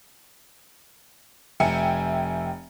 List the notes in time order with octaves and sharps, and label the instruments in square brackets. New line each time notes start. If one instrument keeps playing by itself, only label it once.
[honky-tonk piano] F1 E5 G5 G#5 C#7